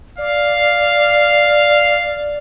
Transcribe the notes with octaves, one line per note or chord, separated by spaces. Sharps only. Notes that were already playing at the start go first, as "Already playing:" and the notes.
D5 F5